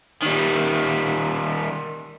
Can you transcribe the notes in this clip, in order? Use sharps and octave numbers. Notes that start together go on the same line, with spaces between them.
D#3 G3